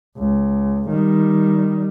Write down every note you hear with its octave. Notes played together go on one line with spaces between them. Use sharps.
C#2
D#3 G3